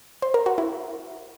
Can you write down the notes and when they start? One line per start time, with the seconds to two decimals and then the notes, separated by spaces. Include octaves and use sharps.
0.22 C5
0.34 A#4
0.46 F#4
0.58 E4